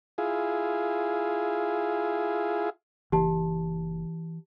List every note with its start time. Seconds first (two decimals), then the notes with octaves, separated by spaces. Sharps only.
0.18 E4 F4 G#4
3.12 F#1 E3 G4 A5